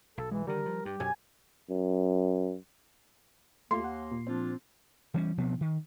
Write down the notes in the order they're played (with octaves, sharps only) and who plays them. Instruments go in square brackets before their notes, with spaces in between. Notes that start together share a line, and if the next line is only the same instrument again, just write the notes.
[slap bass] B1 [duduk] A4
[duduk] E3 [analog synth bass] G#3
[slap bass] D3 D#3 [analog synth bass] G3 [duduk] A#4
[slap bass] F3
[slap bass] G2 [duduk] G4
[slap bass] F#2 B2 [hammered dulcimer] G#5
[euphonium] F#2
[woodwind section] D#2 A#3 [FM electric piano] A3 F4 [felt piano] C6
[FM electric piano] F#5
A#2
[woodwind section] F3 D4 F4 [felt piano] C4
[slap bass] E3 G3 C#4
B2 F3 B3 C4
D#3